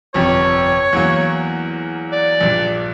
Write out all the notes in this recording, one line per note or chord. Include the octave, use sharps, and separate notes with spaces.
G1 F2 C3 C#5
E2 F#3 A#3
D5
A#1 G2